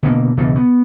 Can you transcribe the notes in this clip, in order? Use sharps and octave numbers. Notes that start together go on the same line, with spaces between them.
B2 D3 E3 A#3
C#2 G2 B2 E3
B3